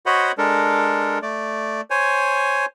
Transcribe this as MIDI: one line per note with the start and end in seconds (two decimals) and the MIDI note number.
0.06 0.32 66
0.06 0.32 72
0.06 0.32 73
0.06 0.32 75
0.06 0.32 78
0.06 0.32 83
0.38 1.19 56
0.38 1.19 62
0.38 1.19 69
0.38 1.19 70
1.22 1.81 57
1.22 1.81 74
1.91 2.66 72
1.91 2.66 73
1.91 2.66 80